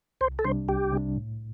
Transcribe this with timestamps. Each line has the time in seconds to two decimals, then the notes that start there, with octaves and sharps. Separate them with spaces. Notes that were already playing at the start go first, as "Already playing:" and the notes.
0.21 C2 C5
0.39 A4
0.45 C3 G3 D4 C5
0.69 C2 G4
0.92 C3 G3 D4
1.16 A2